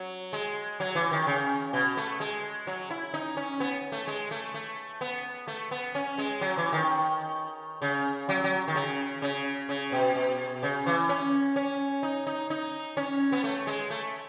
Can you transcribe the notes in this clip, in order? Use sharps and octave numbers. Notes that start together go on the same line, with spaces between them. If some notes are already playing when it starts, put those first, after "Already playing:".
Already playing: F#3
G#3
F#3
E3
D#3
C#3
B2
A3
G#3
F#3
E4
D#4
C#4
B3
A3
G#3
A3
A3
B3
A3
B3
C#4
G#3
F#3
E3
D#3
C#3
F#3
F#3
D#3
C#3
C#3
C#3
B2
B2
C#3
E3
C#4
C#4
D#4
D#4
D#4
C#4
B3
A3
G#3
A3